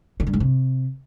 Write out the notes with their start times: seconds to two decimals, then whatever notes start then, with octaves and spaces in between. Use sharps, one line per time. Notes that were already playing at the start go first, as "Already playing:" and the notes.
0.20 D#3
0.27 G2
0.33 G#2
0.40 C3